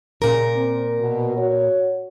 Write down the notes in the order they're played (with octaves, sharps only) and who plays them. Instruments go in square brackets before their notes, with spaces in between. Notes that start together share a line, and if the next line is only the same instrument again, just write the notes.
[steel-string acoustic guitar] A#2 A#4 [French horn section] C#3
[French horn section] C4
B2
F#4 C#5